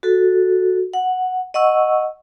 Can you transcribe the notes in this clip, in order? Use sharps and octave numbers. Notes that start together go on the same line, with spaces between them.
F#4 A4
F#5
D#5 F#5 C#6 E6